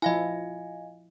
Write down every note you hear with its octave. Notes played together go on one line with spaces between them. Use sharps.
F3 E4 D#5 F5 G#5